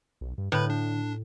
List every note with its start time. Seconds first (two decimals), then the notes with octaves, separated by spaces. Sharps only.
0.21 B1
0.38 G2
0.52 A2 D3 B4 B5
0.70 D4